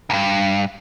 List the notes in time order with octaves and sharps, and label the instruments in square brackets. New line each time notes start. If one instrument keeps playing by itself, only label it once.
[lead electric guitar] D2 G2